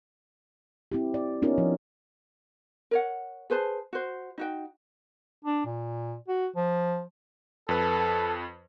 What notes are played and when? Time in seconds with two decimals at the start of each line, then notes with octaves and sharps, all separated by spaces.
0.92 C4 E4 G4
1.14 D5
1.42 B3 C#4 D#4 F4 A#4
1.58 F3
2.91 A#4 C#5 F#5
3.50 G#4 B4 C5 A5
3.93 F#4 C5
4.38 D#4 F#4 G5
5.44 D4
5.65 A#2
6.28 F#4
6.56 F3
7.69 F2 A4 B4